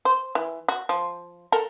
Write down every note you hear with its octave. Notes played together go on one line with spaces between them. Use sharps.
C5
E3
F#4
F3
A4 A#4